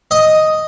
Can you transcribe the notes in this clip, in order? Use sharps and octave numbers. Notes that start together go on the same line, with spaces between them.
D#5